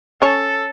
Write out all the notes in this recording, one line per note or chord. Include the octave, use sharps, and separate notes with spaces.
C#4 A4 C#5